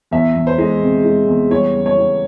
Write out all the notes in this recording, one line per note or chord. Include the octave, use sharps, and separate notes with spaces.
E2 E5
E2
C5
G#3
C3
G#3
E2
G3 C#5
C#3
C#5
G3